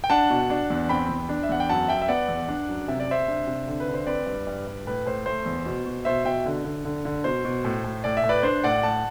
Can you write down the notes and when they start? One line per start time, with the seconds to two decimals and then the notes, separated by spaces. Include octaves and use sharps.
0.04 G5
0.10 D4 F#5 A5
0.30 B2
0.50 D4
0.70 E2
0.89 C4 G5 B5
1.09 E2
1.29 D4
1.43 E5
1.49 E2 F#5
1.60 G5
1.69 F#2 F#5 A5
1.88 F#2 E5 G5
2.02 E5
2.08 B3 D5 F#5
2.29 E2
2.49 D4
2.69 F#2
2.88 C3 E5
3.00 D5
3.08 C3 C5 E5
3.28 D4
3.47 C3
3.67 D3
3.80 B4
3.88 D3
3.94 C5
4.07 C4 B4 D5
4.26 G2
4.47 G2
4.67 G2
4.87 A2 B4
5.06 A2 C5
5.26 A3 C5
5.46 E2
5.66 B2
5.86 B2
6.05 B2 C5 E5
6.25 B2 E5 G5
6.46 D3
6.65 D3
6.85 D3
7.05 D3
7.24 B2 C5
7.45 B2
7.64 A2
7.84 A2
8.04 A2 D5
8.17 E5
8.23 A2
8.29 B4 D5
8.43 D4 C5
8.64 A2 D5 F#5
8.83 A2 F#5 A5